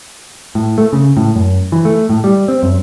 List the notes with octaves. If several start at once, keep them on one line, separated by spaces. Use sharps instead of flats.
A2
A3
C#3
A2
F#2
E3
A3
A2
G3
C4
F#2